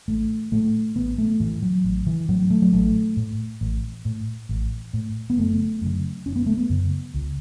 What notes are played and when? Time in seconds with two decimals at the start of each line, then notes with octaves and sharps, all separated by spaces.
0.08 A1 A3
0.52 A2 A3
0.96 A1 B3
1.18 A3
1.40 A2 E3
1.62 F#3
1.84 A1
2.07 E3
2.29 A2 F#3
2.50 A3
2.62 F#3
2.73 A1 A3
3.17 A2
3.61 A1
4.05 A2
4.49 A1
4.93 A2
5.30 B3
5.37 F#1 A3
5.81 F#2 C#3
6.26 F#1 C#4
6.36 B3
6.46 A3
6.57 B3
6.70 F#2 C#3
7.14 C#2